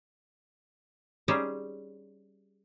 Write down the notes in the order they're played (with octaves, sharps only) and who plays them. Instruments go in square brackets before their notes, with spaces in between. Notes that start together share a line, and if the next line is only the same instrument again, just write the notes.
[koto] G3 C#4 D#4 G4 G#4 C5